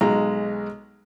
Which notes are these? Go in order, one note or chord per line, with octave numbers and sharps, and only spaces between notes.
B1 G#3 A#5